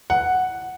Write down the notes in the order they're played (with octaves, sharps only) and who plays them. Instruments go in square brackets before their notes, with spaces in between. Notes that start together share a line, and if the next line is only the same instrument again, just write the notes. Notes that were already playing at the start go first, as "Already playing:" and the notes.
[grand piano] F#5